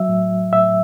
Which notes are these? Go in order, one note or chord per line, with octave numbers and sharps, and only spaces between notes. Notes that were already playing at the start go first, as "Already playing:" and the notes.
Already playing: F#3 E5
A2
A2 E5